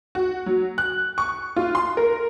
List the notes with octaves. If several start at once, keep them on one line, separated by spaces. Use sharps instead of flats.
F#4
F#3
F#6
C#6
F4
C6
A#4